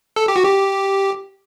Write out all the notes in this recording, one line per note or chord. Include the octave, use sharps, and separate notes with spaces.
A4
G4
F#4
G4